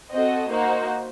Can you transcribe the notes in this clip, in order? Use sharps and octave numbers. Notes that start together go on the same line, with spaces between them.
C4 F#4 A4 D#5
A#3 D#4 F#4 C5